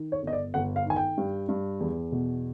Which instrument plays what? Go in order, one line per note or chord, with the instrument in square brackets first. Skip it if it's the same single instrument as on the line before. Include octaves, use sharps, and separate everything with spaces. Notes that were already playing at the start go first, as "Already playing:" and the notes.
Already playing: [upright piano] D#3
C#5
G1 D#5
D5
G1 F#5
F5
D#3 G#5
G5
G2
G2
E2
B2